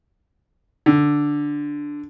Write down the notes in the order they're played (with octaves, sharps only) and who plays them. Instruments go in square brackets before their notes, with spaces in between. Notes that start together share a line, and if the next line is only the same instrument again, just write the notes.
[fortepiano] D3